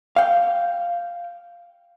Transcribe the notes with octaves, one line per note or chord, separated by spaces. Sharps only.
F5 G5